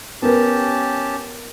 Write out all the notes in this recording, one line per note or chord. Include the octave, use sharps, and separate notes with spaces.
B3 C#4 G4 A#4 A5